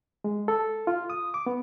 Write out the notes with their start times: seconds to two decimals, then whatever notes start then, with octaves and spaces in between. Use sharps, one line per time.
0.24 G#3
0.48 A4
0.87 F4
1.10 D#6
1.34 D6
1.46 B3